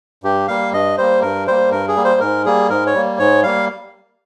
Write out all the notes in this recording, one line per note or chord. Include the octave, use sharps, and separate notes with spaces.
G2 G4
G3 A#3 F5
G2 D#5
G3 A#3 C5
G2 A#4
G3 A#3 C5
G2 A#4
G#4
G3 A#3
C5
G#2 A#4
G3 A#3 G#4
G#2 A#4
C#5
G3 A#3
G#2 C#5
G3 A#3 F5